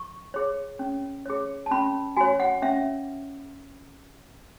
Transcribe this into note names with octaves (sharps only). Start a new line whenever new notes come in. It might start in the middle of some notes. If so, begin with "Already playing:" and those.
Already playing: C#6
G#4 C#5
C#4
G#4 C#5
A5
C#4 B5
F#4 C#5 G#5
F#5
C#4 E5